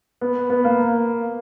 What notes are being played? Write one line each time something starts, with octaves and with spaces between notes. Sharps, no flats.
B3
B3
A#3